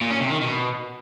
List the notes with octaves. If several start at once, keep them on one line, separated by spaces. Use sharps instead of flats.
A#2
C#4
C3
D#3
B2